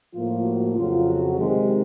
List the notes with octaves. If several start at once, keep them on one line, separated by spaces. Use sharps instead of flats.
A2 F3 A#3 F4
F#4
F2 C#3 F#3 F4
F#4
C3 D#3 G#3 C4 G4